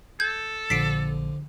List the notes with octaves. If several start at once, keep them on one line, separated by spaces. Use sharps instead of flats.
A4 G6 G#6
A#1 D3 F3 B6 C7 D7